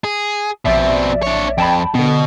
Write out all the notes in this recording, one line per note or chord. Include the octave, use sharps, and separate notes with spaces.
G#4
A#1 B2 C4 D5 E5
D4 C#5
F2 G5 A5 B5
B2 D3 B3